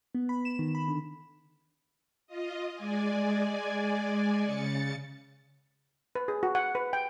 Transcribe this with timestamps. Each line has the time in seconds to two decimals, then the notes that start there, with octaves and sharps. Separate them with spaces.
0.15 B3
0.29 B5
0.45 E7
0.59 D#3
0.75 B5
0.88 D3
2.27 F4 D#5
2.75 G#3 D5 G#5
4.43 C#3 A6 C#7
6.15 B4
6.28 G#4
6.43 F#4
6.55 F#5
6.75 B4
6.93 G5